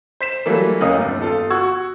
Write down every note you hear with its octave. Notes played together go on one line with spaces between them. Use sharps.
C5 B6 E7
E3 F#3 G3 A3 A#3
F1 C#4 A#4 D#5 F5 D#6
G1 D#2
G1 F4 A4
F#4 C#6 E6 G#6